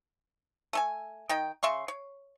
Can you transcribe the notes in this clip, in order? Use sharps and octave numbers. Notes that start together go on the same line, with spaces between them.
A3 A4 G#5
D#3 D#4 G5
C#3 E5 C6 C#6
C#5